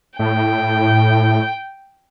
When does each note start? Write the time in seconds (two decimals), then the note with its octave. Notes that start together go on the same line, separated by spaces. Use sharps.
0.19 A2 G5